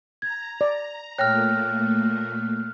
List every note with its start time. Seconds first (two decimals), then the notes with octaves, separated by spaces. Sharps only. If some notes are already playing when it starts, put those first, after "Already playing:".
0.22 A#5 G#6
0.61 D5
1.18 A#2 A3 A#3 C#5 G5 F6 F#6 A#6